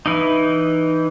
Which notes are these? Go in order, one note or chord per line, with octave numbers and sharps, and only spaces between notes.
E3 D#4